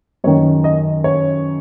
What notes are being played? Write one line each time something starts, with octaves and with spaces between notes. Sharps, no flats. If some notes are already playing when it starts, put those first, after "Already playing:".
F#2 D#3 C#5
D#5
C#5